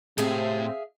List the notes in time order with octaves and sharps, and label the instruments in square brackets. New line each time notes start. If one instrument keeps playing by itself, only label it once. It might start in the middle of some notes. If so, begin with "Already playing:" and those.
[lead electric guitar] A2 [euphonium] C3 [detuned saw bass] C4 [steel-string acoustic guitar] G#4 E5 F5